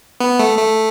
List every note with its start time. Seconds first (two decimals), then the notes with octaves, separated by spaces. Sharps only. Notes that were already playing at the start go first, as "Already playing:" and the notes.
0.20 B3
0.39 A3
0.58 A3